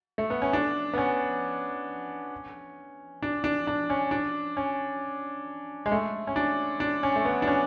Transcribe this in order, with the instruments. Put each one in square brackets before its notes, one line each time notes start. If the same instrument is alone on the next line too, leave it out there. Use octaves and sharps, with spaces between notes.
[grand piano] A3
B3
C#4
D4
B3
C#4
D4
D4
D4
C#4
D4
C#4
G#3
A3
C#4
D4
D4
C#4
A3
B3
D4
C#4